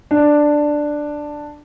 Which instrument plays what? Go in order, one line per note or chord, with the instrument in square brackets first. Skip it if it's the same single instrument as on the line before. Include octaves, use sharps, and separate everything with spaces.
[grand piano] D4